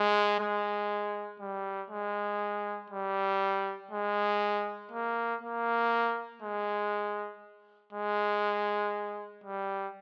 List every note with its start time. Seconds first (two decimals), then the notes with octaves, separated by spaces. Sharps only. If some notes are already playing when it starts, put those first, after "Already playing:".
Already playing: G#3
0.40 G#3
1.40 G3
1.90 G#3
2.90 G3
3.91 G#3
4.91 A#3
5.42 A#3
6.42 G#3
7.93 G#3
9.44 G3